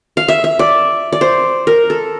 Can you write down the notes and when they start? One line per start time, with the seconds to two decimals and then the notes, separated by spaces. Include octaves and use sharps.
0.17 F5
0.28 E5
0.44 E5
0.59 D5
1.13 D5
1.21 C5
1.67 A#4
1.90 A4